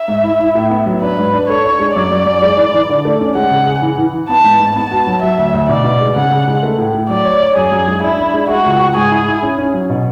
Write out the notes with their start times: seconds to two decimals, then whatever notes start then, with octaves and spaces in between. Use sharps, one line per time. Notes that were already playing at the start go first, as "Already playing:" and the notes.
Already playing: E5
0.08 G#2
0.24 E4
0.40 E4
0.55 A2
0.70 B3
0.86 F#3
1.02 D4 B4
1.18 G#2
1.33 D4
1.48 A4 C#5
1.64 D4
1.80 G#3
1.96 F#2 D5
2.11 F#2
2.26 F#2
2.42 G#3
2.57 E3
2.74 E3
2.89 D3
3.05 A3
3.21 C#4
3.35 G#3 F#5
3.51 C#3
3.66 G#4
3.82 E3
3.98 E3
4.14 E3
4.29 B3 A5
4.44 G#2
4.60 G#2
4.76 B3 A5
4.91 F#4
5.07 F#3
5.22 F#3 E5
5.38 D2
5.54 D2
5.69 B2 D5
5.84 B2
6.01 G#3
6.16 C#3 F#5
6.31 C#3
6.48 G#3
6.63 A3
6.78 A2
6.94 A2
7.09 F#3 D5
7.25 C#5
7.41 C#5
7.56 F#2 G#4
7.72 F#2
7.87 G#3
8.03 D4 E4
8.19 D4
8.34 G#3
8.49 G#3 F#4
8.66 C#2
8.80 C#2
8.96 G#2 G#4
9.11 E4
9.28 E4
9.43 C#4
9.58 C#4
9.74 F#3
9.89 B2